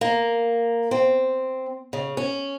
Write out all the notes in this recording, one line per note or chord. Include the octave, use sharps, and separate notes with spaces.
A#3
C4
C#3
C#4